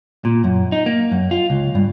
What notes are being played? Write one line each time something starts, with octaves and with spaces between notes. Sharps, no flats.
A#2
F#2
D#4
A#3
F#2
F4
C#2
G2